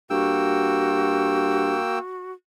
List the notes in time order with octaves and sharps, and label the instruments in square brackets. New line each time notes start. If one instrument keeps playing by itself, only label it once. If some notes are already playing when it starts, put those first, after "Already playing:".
[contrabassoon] G2 [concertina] A#3 G5 E6 [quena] F#4